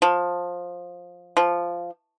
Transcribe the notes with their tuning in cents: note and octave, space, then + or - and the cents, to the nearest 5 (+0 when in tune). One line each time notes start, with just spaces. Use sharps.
F3 +15
F3 -5